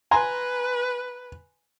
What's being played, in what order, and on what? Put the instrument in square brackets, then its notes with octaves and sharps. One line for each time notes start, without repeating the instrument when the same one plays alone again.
[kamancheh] B4 [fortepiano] G#5 A#5 C6